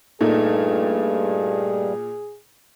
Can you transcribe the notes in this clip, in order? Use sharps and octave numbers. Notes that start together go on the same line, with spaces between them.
G2 A#2 A3 D#4 G#4